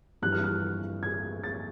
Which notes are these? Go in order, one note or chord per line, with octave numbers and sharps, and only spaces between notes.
G2 E3 G3 F#6
F6
F#6
G#6
A6